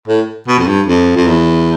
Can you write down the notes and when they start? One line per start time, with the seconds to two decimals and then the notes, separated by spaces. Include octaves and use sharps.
0.08 A2
0.47 B2
0.58 F2
0.67 G2
0.86 F2
1.16 F2
1.27 E2